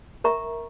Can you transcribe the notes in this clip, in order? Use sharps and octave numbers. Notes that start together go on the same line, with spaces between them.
A#4 E5 A#5 C#6